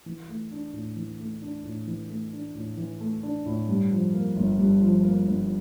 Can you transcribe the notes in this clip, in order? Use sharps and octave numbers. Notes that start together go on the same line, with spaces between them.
E3
A3
D4
A2
E3
A3
D4
A2
E3
A3
D4
A2
E3
A3
D4
A2
G2
F3
A#3
G1
G2
F3
A#3
G1